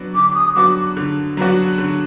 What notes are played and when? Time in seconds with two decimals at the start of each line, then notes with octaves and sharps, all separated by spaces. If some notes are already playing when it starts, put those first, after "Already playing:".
Already playing: F#3 B3 D4 F#4
0.14 D3 D6
0.30 D6
0.34 D#6
0.55 F#3 B3 D4 F#4 D6
0.97 D3
1.37 F#3 B3 D4 F#4
1.78 D3